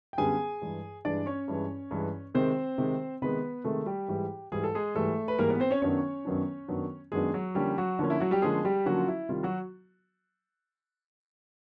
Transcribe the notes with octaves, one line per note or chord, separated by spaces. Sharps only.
G5
F#2 D3 G3 B3 G#4 G#5
G2 E3 G#3
G2 E3 G#3 D4 D5
C#4 C#5
G2 E3 G#3
G2 E3 G#3
C3 D#3 G#3 C4 C5
C3 D#3 G#3
C3 D#3 G#3 B3 B4
C3 D#3 G#3 A3 A4
G3 G4
G#2 E3 G3
G#2 E3 G3 G#4
A4
G#3 G#4
G#2 E3 G3 A3 A4
B4
G#2 E3 G3 A#3 A#4
B3 B4
C4 C5
C#4 C#5
F#2 D#3 F#3 B3 C#4 D4 C#5
F#2 D#3 F#3 B3 D4
F#2 D#3 F#3 B3 D4
F#2 D#3 F#3 G#3 B3 D4 G#4
F#3 F#4
D3 F3 G3 A#3 C#4 G4
F#3 F#4
D3 F3 A#3 C#4
E4
F#3 F#4
G3 G4
D3 F3 G#3 A#3 C#4 G#4
G3 G4
D3 F3 F#3 A#3 C#4 F#4
F4
E4
C3 D#3 G3 F4
F#3 F#4